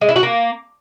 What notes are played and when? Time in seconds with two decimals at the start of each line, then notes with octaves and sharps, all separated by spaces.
0.01 G#3
0.09 E4
0.16 F#4
0.23 A#3